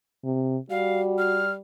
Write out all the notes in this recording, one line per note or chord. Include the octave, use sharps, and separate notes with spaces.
C3
G3 F#4 F5
F6